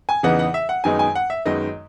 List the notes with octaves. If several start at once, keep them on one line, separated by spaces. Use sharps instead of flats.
G#5
E2 C#3 E3 B3 D#4 F#5
F#5
E5
F#5
F#2 D#3 G#3 B3 D#4 G#5
G#5
F#5
E5
F#2 D#3 G#3 B3 D#4 D#5